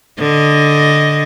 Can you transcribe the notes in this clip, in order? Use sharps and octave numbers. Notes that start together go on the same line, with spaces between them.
D3 D#5